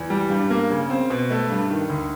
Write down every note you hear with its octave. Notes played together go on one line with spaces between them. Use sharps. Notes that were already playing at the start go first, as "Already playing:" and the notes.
Already playing: E2
G3
G2
A#3
C#3
C4
B2
A3
G2
D#3
D2